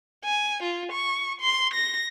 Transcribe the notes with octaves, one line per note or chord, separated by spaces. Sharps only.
G#5
F4
C#6
C6
A#6